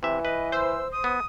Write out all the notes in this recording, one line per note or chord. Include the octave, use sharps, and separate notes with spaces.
C3 E3 E5
B4 D#5
C5 E6
D#6
B3